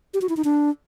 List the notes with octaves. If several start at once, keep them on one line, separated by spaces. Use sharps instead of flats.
G4
F#4
E4
D#4
D4